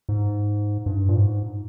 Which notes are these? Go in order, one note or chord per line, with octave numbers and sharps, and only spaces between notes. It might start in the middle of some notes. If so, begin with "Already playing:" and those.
G#2
G2
A#2
G#2